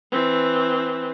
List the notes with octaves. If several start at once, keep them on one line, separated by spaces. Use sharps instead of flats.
E3 C4